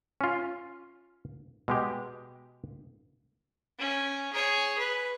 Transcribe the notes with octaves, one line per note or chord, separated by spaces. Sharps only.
C#4 F4
B2 G#3 G4
C#4
G#4 C#5
B4